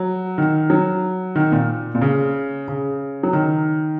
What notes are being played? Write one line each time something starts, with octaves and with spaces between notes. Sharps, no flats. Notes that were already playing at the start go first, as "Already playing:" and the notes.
Already playing: F#3
D#3
F#3
D#3
A#2
A#2
C#3
C#3
F#3
D#3